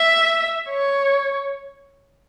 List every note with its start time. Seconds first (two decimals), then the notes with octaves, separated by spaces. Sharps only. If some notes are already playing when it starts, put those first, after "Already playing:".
Already playing: E5
0.70 C#5